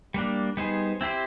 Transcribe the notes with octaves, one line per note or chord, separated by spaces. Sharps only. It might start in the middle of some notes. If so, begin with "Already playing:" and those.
G3 A#3 D4
G3 B3 D#4 G#4 C5
C4 E4 G4 C5